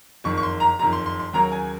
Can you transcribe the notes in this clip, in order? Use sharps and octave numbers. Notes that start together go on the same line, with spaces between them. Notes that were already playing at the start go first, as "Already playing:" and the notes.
F#1 F2 D#3 C#6
C#6
C6
A#5
F#1 F2 D#3 A#5
C6
C6
C6
D#2 C#3 F#3 A#3 C#4 A#5
G#5